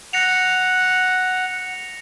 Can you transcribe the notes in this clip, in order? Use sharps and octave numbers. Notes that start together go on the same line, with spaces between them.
F#5 A#6 C#7 F7